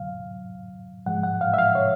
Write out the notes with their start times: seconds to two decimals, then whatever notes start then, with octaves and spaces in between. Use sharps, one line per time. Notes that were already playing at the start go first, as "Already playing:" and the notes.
Already playing: F2 D3 F#3 F5
1.06 G#2 F3 G#3 F#5
1.23 F#5
1.41 F5
1.54 E5
1.58 F5
1.75 C#5